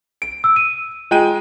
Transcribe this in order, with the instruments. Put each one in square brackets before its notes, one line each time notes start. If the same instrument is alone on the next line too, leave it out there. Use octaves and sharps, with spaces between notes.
[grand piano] D7
[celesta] E6
D#7
[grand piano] G#3 G5 D#7 [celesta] F4